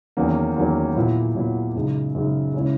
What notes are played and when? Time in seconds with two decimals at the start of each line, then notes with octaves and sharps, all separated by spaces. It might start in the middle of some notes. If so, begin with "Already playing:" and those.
0.17 E2 D#3 F#3 A#3 C#4
0.56 E2 D#3 F#3 A#3 C#4
0.96 A#2 F#3 B3 E4
1.35 A#2 F#3 B3 E4
1.75 F#2 C#3 G#3 D#4
2.15 F#2 C#3 G#3 D#4
2.54 C#3 G#3 C#4 E4